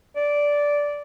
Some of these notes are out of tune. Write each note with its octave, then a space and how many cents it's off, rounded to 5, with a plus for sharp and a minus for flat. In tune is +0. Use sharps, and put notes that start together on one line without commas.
D5 -10